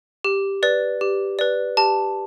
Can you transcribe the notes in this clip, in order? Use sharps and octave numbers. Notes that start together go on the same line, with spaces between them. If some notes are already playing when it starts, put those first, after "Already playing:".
G4
B4 D5
G4
B4 D5
G4 A5